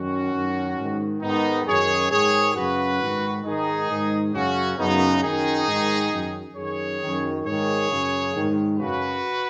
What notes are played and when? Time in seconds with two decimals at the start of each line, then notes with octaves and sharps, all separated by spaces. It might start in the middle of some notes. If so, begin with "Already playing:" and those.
Already playing: F#2 D#3 C#4 F#4
0.33 F#2 D#3
0.78 G#2 D#3
1.22 G#2 D#3 B3 D#4
1.67 F#2 D#3 G#4 C#5
2.11 G#2 D#3 G#4 C#5
2.56 F#2 C#3 F#4 B4
3.00 G#2 D#3
3.44 G#2 D#3 D#4 G#4
3.89 G#2 D#3
4.34 F#2 C#3 C#4 F#4
4.78 F#2 C#3 B3 D#4
5.22 F#2 D#3 D#4 G#4
5.67 G#2 D#3
6.12 F#2 D#3
6.56 F#2 D#3 G#4 C#5
7.00 F#2 D#3
7.45 G#2 D#3 G#4 C#5
7.89 F#2 C#3
8.34 G#2 D#3
8.78 F#2 C#3 F#4 B4